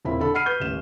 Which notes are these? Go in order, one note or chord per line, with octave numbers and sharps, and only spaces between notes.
E1 A#2 C4 E4 B5
D3 A4 B5
F#5 B5 F6 C7 D#7
B4 G6
D#1 A1 E7